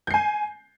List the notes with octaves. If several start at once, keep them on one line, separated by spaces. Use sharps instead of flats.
G#5 G6 C7